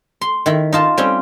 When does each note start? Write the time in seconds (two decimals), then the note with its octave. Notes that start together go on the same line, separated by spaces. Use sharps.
0.21 C6
0.46 D#3 E4
0.73 D#4 F4 A5
0.98 G3 C4 C#4